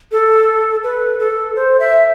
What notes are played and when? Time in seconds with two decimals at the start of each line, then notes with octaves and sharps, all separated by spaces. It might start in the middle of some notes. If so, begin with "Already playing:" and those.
0.12 A4
0.83 B4
1.19 A4
1.56 C5
1.80 E5